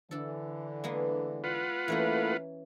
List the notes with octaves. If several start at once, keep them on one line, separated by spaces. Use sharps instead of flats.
D3 E3 D4 A4
G#3 A#3 B3
F4 B4 F#5
E3 A3 A#3 C#4 E4 A#4